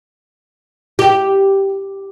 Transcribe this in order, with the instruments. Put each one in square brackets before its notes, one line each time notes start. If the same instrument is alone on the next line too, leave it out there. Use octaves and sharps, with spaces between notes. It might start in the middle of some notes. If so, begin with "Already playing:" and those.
[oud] G4